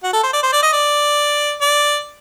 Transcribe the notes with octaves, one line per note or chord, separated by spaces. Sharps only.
F#4
A4
C5
D5
C5
D5
D#5
D5
D5